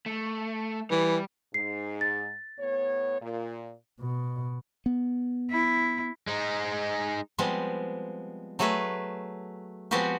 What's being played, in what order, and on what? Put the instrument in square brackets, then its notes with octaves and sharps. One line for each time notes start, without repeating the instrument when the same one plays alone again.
[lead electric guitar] A3
[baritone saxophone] E3 [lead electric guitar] G3
[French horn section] G#2 [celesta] C7
[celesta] A6
[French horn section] A2 B3 C#5
A#2
[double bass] B2
[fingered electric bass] B3
[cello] E4
[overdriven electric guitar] G#3 D#4
[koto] F3 G3 G#3 B3 C4
F#3 A3 G#4 A4 B4
F3 G#3 B3 C4 F#4 G4